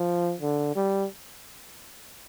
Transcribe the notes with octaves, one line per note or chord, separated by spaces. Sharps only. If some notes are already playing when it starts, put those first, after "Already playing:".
Already playing: F3
D3
G3